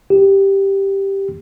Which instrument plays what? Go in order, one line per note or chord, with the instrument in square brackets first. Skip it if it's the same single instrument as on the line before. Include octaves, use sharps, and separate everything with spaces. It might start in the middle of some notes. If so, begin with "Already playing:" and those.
[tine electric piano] G4